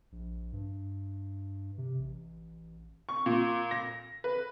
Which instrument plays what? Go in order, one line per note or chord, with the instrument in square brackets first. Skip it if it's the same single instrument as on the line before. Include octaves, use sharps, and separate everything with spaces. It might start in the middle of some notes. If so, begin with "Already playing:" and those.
[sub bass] A#1
G2
C3
A1
[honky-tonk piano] C#6
A#2
A#6
B4